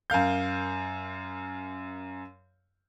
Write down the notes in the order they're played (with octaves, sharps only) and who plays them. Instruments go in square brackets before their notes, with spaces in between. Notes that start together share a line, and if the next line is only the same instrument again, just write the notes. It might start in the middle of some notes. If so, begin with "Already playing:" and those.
[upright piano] F#2 A#4 F5 G6